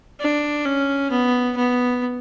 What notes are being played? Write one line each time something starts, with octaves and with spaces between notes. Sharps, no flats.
D4
C#4
B3
B3